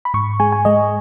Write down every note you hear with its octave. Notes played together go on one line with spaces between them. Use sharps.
B5
G#2 C#6
G#3 G#5
G#5
G#3 D#5